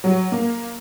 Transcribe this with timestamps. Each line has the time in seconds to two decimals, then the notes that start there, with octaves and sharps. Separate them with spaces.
0.04 F#3
0.32 A#3